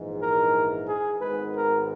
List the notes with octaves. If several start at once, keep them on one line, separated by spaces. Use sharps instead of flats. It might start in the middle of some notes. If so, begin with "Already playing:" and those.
Already playing: A#1 G#2 E3 G#3
A#4
G#4
G#1 G#2 D#3 G#3 B3 B4
A#4